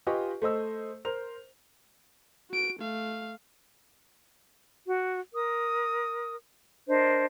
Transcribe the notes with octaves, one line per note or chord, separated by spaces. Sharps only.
F4 G4 B4 D#5 G#5 C#6
A3 C5 D#5 E6
A#4 C5 F7
F#4 D7
A3 F5
F#4
A#4 D#6
D4 A#4 C5 D#5